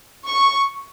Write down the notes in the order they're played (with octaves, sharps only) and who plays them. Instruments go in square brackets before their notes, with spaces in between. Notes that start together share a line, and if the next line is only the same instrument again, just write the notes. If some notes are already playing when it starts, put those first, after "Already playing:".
[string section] C#6